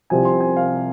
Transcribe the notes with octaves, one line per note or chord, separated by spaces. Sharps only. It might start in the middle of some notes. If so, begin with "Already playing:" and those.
C2 C3 F3 C4 G#5
C6
G#5
F5